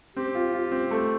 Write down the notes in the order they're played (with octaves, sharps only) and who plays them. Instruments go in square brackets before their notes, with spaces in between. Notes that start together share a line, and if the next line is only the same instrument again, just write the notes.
[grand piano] C4 [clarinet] G4
[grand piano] F4
F4
C4
A3